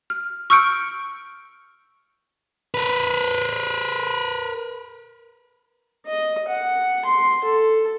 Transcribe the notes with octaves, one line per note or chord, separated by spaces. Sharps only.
F6
C#6 E6 F6 G6 C#7 D7
A#4 B4
D#5
F#5
C6
A4